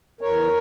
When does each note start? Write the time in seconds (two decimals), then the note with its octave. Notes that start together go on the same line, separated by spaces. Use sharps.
0.21 E2 A#4 C#5